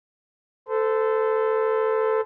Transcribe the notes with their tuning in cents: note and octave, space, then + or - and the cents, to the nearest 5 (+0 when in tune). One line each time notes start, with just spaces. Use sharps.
A4 +0 C5 -30